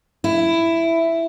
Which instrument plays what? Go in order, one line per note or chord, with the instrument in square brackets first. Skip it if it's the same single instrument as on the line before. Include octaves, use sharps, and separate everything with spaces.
[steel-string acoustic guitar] E4